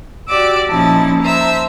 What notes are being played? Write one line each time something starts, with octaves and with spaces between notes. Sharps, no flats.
F#4 G4 D5 D6 E6
A#2 F3 C#4 D#4 E4 A5
C5 E5 A5 A#5